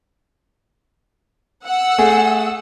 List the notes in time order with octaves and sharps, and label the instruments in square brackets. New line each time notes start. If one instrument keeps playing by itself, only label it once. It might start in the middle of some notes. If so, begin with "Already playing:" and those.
[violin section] F#5 E6
[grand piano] A3 G#4